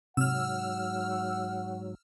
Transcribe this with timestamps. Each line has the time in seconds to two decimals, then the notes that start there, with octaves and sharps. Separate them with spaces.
0.17 G#2 C3 F#3 F#5 E6 F6